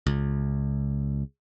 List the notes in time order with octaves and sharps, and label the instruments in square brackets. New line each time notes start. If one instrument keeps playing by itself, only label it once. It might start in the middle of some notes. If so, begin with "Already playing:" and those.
[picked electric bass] C#2